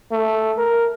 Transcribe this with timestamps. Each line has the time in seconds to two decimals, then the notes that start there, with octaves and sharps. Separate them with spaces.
0.11 A3
0.58 A#4